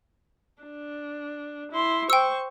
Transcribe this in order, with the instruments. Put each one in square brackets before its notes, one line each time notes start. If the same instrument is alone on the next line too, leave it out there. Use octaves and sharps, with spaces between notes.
[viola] D4
E4 C6
[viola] C5 C#6 [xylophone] G5 E6